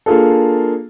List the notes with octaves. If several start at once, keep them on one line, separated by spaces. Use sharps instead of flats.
A#3 D4 F4 G#4 A4